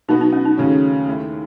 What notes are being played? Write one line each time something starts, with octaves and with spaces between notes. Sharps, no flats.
B2 F#3 B3 D#4 F#4
D#4
C#4
D#4
D#2 C#3 F#3 A3 C#4
D#2 D#3 A3 E4